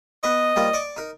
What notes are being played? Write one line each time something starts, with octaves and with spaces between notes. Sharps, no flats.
B3 B4 D#5 C#6
F3 G3 A#3
D5 C#6 D6
D#4 A#4